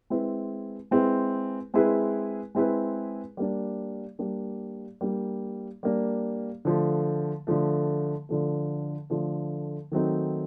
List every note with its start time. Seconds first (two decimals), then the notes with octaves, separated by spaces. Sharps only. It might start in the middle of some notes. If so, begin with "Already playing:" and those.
0.10 G#3 C4 E4 G#4 B4
0.91 G#3 C4 E4 G#4 B4
1.74 G#3 C4 E4 G#4 B4
2.55 G#3 C4 E4 G#4 B4
3.37 G3 A#3 D4
4.19 G3 A#3 D4
5.01 G3 A#3 D4
5.83 G3 A#3 D4
6.65 D3 F3 A3
7.47 D3 F3 A3
8.29 D3 F3 A3
9.10 D3 F3 A3
9.92 D#3 F#3 A3 C4 D#4